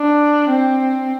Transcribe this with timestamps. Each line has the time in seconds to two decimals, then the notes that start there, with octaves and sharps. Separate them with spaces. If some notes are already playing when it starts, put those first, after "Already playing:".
Already playing: D4
0.50 C4